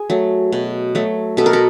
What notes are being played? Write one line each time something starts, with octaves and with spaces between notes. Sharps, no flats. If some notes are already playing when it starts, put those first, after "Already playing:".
Already playing: G#4
F#3 A3
B2
F#3 A3
B2 A4
A#4
A4